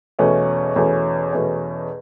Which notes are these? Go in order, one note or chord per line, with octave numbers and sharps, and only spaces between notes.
E2 B2 A3 C#4
E2 B2 A3 C#4
E2 B2 A3 C#4